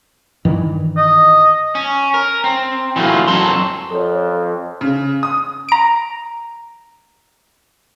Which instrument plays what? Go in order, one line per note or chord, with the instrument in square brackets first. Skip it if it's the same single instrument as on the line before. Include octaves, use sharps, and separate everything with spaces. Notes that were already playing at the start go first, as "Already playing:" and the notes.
[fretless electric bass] G2 D#3 E3
[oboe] D#5
[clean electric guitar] C#4
A#4
C4
E3 F#3 A3 A#3 F4
F#2 F#3 C4 A4 C6
[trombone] F2 [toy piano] A4 C#5
[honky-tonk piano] C#3
D#6
[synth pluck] A#5 D7